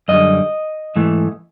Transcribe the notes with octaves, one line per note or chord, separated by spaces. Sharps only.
F#2 D3 G3 D#5
G#2 E3 A3